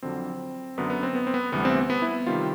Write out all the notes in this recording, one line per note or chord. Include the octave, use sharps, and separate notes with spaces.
F2 D3 F#3 C4
F#2 D3 F#3 B3
B3
C4
B3
C4
B3
D2 C3 E3 G3 B3
C4
B3
E4
C3 D#3 G3 F4